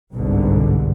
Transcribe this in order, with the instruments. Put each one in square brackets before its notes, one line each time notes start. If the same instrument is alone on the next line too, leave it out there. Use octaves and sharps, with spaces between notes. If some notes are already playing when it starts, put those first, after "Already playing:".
[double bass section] G1 C2 G#2 B2 D3